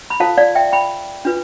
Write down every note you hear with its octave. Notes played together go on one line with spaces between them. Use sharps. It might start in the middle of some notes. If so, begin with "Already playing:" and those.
B5
F4 A4 C5 F5 A5
D5 F5
E5 G5
G5 B5
D4 F4 B4